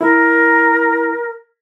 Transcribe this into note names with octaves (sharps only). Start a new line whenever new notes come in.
E4 A#4